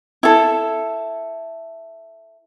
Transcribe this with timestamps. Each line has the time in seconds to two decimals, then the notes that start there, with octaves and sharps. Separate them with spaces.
0.23 E4 A4